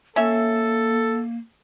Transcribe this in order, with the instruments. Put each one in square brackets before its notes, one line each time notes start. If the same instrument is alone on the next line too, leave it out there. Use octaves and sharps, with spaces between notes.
[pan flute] A#3 [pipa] C#4 E5 [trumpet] A4